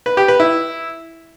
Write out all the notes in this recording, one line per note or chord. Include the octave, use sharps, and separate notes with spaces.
B4
G4
B4
E4